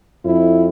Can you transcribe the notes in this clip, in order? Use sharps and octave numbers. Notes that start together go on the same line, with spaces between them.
F2 E4